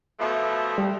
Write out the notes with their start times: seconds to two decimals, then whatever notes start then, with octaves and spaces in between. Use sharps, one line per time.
0.20 B2 F3 A3
0.78 G3